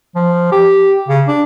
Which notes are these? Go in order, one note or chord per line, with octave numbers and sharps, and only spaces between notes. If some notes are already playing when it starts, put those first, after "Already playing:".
F3
G4
C#3
D4